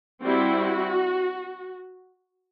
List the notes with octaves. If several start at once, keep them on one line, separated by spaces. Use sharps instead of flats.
G3 C4 E4 F#4